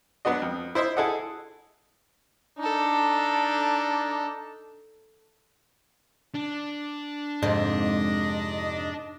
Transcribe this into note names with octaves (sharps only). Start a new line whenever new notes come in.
F#3 B3 D4 F#4 D#5
F2
E4 C5 D#5 E5
E4 G#4 A4 D#5 F#5
D4 D#4 A4
D4
F2 G#2 C3 D#5